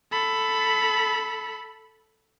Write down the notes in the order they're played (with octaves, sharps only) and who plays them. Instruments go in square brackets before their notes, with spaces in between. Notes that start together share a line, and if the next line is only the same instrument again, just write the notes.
[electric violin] A4 B5